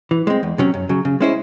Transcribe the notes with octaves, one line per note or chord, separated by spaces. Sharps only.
E3
G#3 C4
E2
C3 F#3 C#4
F#2
C#3 F#3
C#3
G#3 C#4 E4 C5